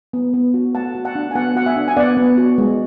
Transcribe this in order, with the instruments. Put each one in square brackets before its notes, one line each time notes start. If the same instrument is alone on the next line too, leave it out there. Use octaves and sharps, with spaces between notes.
[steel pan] B3
B3
F#4
A3 F#5 A5
F#4
F#5 A5
D4
G#5
B3 F#5 A5
F#4 F#5
E5 G#5
D4
G#5
B3 D5 F#5
B3
F#4
G#3